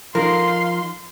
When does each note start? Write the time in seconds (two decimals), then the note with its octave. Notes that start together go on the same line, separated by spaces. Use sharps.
0.15 F3 D#4 A#4 F5 C6